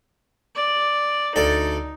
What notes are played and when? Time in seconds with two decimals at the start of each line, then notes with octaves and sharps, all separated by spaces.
0.56 D5
1.36 D2 D#4 A4 D5